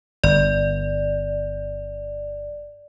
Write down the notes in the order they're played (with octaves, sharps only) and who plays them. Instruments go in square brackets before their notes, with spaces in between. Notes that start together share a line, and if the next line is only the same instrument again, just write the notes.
[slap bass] G1 [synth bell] D5